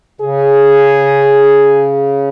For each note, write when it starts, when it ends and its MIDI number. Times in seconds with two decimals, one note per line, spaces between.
0.21 2.29 49
0.21 1.91 68